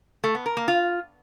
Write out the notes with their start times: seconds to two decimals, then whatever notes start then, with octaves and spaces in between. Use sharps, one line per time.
0.24 A3
0.35 B3
0.46 A#4
0.57 A#3
0.68 F4